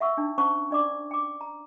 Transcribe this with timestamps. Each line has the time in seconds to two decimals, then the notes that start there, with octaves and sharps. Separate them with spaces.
0.01 E5 F#5 C#6 E6
0.17 D4 D#4
0.38 C#4 C5 F#5 A5 C#6
0.70 D4 D5 D6
1.11 G5 D6
1.41 A#5